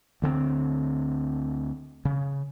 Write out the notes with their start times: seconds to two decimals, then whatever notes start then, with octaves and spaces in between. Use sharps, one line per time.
0.22 D2 D3 G3 C4
2.05 C#3